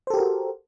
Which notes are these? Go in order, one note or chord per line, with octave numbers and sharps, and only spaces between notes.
F#4 G4 A4 A#4 C5